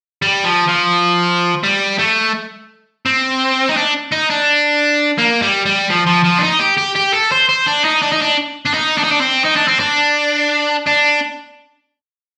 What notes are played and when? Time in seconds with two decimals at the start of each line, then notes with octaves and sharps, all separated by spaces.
0.22 G3
0.45 F3
0.69 F3
1.64 G3
1.99 A3
3.06 C4
3.69 D#4
3.77 D4
4.12 D#4
4.30 D4
5.18 A#3
5.42 G3
5.66 G3
5.90 F3
6.07 F3
6.24 F3
6.39 D4
6.43 D#4
6.60 G4
6.78 G4
6.96 G4
7.14 A4
7.32 C5
7.49 C5
7.67 D4
7.85 D#4
8.02 D4
8.12 D#4
8.22 D4
8.65 D4
8.73 D#4
8.97 D4
9.04 D#4
9.11 D4
9.21 C4
9.45 D#4
9.56 D4
9.68 C4
9.80 D4
10.86 D4